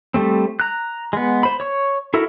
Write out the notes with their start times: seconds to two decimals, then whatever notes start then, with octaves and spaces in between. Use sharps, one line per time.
0.14 G3 A3 C4
0.60 A#5 F#6
1.13 G#3 B3
1.43 C5 B5
1.60 C#5 C#6
2.14 E4 F#4 A4 A#4 E5